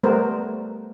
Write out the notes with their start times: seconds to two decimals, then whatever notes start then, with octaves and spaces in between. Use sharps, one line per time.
0.03 G3 A3 B3 A#4 C5